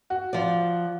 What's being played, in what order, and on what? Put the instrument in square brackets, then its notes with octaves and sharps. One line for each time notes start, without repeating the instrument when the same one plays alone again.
[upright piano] F#4
[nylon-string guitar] F3 D5